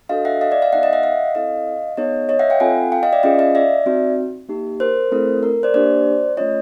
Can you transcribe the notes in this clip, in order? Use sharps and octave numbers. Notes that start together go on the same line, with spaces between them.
D4 F#4 A4 D#5 F5
E5 F#5
D#5 F5
D5 E5
D#5 F5
B3 D#4 G#4 E5 F#5
D#5 F5
E5 F#5
D#5 F5
C4 E4 A4 D#5 F5
B3 D#4 G#4 C#5 D#5
C#5 D#5
E5 F#5
F5 G5
C4 F4 A4 F#5 G#5
F5 G5
D#5 F5
D5 E5
C#4 F4 G#4 D#5 F5
D#5 F5
D5 E5
C4 D#4 F#4
A#3 D#4 G4
A#4 C5
A3 C4 E4 A4
A#4
C5 D5
A#3 D4 G4 C5 D5
A3 C#4 F4 C#5 D#5